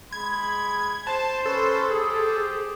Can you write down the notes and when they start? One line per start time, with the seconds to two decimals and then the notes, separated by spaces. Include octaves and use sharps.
0.13 G#3 B5 G#6
1.07 C5 A5
1.46 C#4 A4 B4
1.90 G4 G#4 C5 D#6